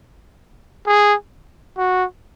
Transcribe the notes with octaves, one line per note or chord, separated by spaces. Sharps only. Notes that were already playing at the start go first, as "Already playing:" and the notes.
G#4
F#4